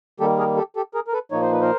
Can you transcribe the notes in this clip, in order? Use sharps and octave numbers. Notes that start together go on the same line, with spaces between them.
D#3 G3 A#3 G4 A4
G#4 A#4
G4 A4
G4 A4
G#4 A#4
A#4
A4 B4
A#2 F3 A#3 D#4 C#5
C5
B4
A#4 C5